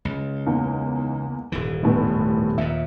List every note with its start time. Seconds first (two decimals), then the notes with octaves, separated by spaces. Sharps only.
0.05 C#2
0.46 E2 A#3 D#4
1.52 D#1 G#2 E3
1.83 F1 A2 B3
2.58 D#2 A#2 E5